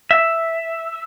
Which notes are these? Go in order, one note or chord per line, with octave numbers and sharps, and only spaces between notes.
E5